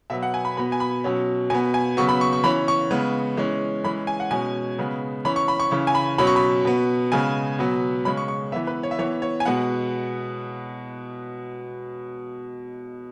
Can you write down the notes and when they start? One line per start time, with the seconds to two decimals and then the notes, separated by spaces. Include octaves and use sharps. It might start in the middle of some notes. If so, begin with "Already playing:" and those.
0.10 B2 F#3 B3 E5
0.23 F#5
0.34 G#5
0.45 B5
0.57 B2 B3 B5
0.72 G#5
0.80 B5
1.04 B2 F#3 C#4
1.50 B2 B3 G#5
1.74 G#5
1.97 C#3 F#3 B3 C#6
2.09 B5
2.21 C#6
2.33 C#6
2.44 E3 C#4 B5
2.68 C#6
2.91 C#3 G#3 B3
3.37 E3 G#3 C#4
3.84 E3 G#3 C#4 B5
4.07 G#5
4.20 F#5
4.31 B2 G#3 C#4 G#5
4.79 C#3 G#3 B3
5.25 E3 C#4 B5
5.36 C#6
5.48 B5
5.60 C#6
5.71 C#3 E3 C#4
5.87 G#5
5.95 B5
6.18 B2 F#3 C#4 B5
6.27 C#6
6.36 B5
6.65 B2 B3
7.12 C#3 G#3 B3 G#5
7.59 B2 F#3 B3
8.05 C#3 G#3 C#4 B5
8.17 C#6
8.28 C#6
8.52 E3 B3 E5
8.67 B4
8.83 C#5
8.91 E5
8.99 E3 C#5
9.02 B3
9.22 C#5
9.40 G#5
9.45 B2 G#3 B3 F#5